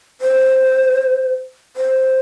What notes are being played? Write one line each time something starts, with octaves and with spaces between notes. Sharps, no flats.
C5
C5